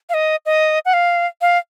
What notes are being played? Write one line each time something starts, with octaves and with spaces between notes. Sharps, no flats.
F5
D#5
D#5
F#5
F5
F5